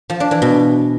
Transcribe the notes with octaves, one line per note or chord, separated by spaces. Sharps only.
F3
D4
E3
B2